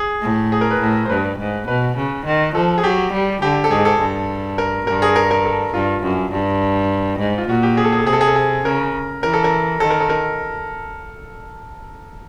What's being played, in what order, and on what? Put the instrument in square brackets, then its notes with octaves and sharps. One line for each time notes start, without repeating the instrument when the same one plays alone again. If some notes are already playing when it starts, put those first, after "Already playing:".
Already playing: [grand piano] G#4
[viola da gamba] A2
[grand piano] G#4
A#4
B4
[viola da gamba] A2
[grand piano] C5
[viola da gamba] G2 [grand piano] B4
[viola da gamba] G#2
[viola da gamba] B2 [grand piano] B4
[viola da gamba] C#3
D#3
[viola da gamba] F3 [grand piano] A4
[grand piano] G#4
[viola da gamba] F#3 [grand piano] G4
[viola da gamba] G3
[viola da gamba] D3 [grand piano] G4
[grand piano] A4
[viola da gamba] G#2 [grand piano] G#4
[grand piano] A4
[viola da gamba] G2
[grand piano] A#4
[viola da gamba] G2 [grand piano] A#4
[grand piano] G#4
A#4
A#4
A4
[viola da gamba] G2 [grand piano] F4
[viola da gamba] F#2
G2
G#2
[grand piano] F4
[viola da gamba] A#2 [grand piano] F#4
[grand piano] G4
G#4
A4
G#4
A4
[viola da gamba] C3 [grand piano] G#4
[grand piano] A4
G#4
A4
G#4
[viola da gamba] C#3 [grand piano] A#4
[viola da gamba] E3 [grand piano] A#4
[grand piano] A4
A#4
[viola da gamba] D#3 [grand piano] A4
[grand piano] A#4
A4
A#4